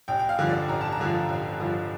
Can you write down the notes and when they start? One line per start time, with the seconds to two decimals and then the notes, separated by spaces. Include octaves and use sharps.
0.08 A1 G5
0.19 G5
0.29 F5
0.39 G2 D3 F3
0.49 D5
0.68 A1 A#5
0.81 A5
0.92 A#5
1.00 G2 D3 F3
1.29 A1
1.60 G2 D3 F3